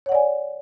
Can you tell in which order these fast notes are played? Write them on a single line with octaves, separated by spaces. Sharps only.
C#5 F#5 D5 G#5